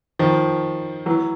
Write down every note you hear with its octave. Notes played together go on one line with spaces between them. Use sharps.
D#3 F3
E3 F#3